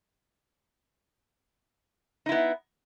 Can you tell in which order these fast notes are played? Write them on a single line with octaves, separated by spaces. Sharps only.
D#4 E4 B3